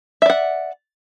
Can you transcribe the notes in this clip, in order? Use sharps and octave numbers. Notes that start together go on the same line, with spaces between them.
D5 E5 F#5